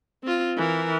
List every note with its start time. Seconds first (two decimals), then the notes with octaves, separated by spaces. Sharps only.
0.23 C4 F4
0.57 E3 A#4